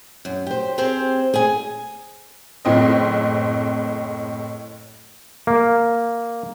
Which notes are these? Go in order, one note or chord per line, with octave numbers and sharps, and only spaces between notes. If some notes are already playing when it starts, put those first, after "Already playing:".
F#2
G4 C5
C4 G4 G#4 C5
G#4 G#5
F#1 A2 C4 D#5
A#3